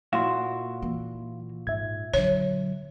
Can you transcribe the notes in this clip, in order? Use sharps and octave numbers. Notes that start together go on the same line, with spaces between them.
A#2 E4 F#4 F5 F#5 C6
E3 A#3
G#2 E5 G#6
D3 F#3 C#5